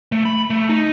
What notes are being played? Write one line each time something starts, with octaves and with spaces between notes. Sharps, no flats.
A3
B5
A3
D#4